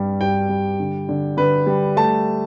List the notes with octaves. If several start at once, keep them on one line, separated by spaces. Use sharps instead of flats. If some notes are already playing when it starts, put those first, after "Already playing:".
Already playing: G2 G3
G2 G5
G3
D3
D3
D3 B4
G3
A3 A5